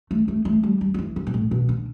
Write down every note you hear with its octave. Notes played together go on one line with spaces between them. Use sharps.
A3
A3
A3
G3
G3
F#3
E3
C#3
B2
A2
B2
D3